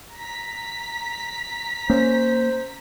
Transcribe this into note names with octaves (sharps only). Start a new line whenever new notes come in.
A#5 B6
A#3 C#4 C5